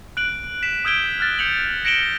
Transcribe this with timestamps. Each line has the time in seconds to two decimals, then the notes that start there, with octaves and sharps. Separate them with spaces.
0.17 F#6 D7 F#7
0.63 B6 E7
0.85 D#6 E6 G6 G#6 D7 G7
1.20 F6 F#6 A6
1.39 G6 C#7 F7 F#7
1.85 A#6 C#7 D7 E7 F#7 G7